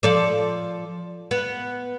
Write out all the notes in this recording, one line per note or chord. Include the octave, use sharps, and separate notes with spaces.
F3 A4 D5
B3